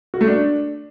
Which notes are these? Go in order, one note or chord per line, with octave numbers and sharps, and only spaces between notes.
F#4
A3
D4